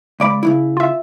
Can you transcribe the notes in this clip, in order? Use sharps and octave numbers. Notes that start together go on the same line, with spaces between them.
C#2 D5 B5
C#3 E3 E4
F4 E5